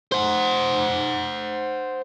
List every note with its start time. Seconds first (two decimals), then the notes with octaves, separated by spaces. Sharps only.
0.12 C5 F#5